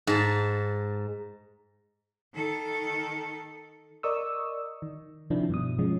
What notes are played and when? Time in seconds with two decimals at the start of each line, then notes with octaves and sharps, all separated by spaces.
0.07 G#2 A5
2.34 D#3 A4
4.03 A#4 D5 D#5 C#6 D#6 E6
4.82 D#3
5.30 C3 D#3 F3 C4 D4 E4
5.50 G2 B2 D#6
5.79 F3 F#3 G#3 C#4